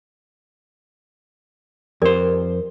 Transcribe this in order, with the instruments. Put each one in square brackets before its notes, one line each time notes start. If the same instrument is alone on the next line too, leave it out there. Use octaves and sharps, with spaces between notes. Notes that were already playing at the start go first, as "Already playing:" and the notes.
[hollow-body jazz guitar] F2 C5 [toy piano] G4 A#4 D5